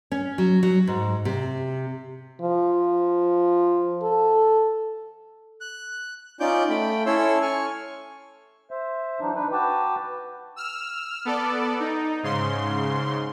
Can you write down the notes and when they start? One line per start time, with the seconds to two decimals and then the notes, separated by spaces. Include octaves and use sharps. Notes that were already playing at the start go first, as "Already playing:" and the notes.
0.12 C#4
0.38 F#3
0.63 F#3
0.87 G#2
1.25 C3
2.41 F3
4.02 A4
5.61 F#6
6.40 C#4 D#4 F4 D5 D6 G6
6.69 A3 G5 B5
7.06 C#4 E4 A4 C#5 C6 E6
7.42 G#5 C#6 F6
8.71 C5 E5
9.20 E3 F#3 D4 D#4
9.35 D4 D#4 B4
9.52 F#4 B4 G5 A5 D6
10.56 E6 F6
11.25 B3 A4 D5
11.80 D#4
12.23 G#2 C#3 C6